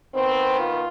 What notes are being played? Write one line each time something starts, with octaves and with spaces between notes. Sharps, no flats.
D#3 B3 C4
F4